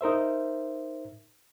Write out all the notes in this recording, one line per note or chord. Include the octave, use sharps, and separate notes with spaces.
D#4 A#4 C5 E5